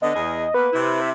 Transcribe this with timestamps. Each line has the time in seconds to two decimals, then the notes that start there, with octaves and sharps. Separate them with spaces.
0.02 D3 B3 D#5
0.15 E2 G#4
0.54 A#3 B3 B4
0.73 C3 E4
1.01 E5